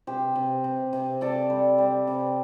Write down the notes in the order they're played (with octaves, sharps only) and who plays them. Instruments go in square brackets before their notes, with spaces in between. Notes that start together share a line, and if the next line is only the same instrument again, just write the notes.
[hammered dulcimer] C3 G4 C5
C3
C3
C3
C3 A4 D5
G3
G3
C3